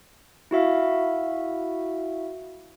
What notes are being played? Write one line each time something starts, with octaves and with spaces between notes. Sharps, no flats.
E4 F#4 E5 F5